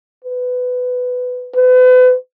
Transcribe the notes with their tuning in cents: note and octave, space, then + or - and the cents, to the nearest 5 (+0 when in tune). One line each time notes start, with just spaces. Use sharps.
B4 +15
B4 +40